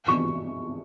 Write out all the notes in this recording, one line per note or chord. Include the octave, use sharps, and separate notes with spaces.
C#6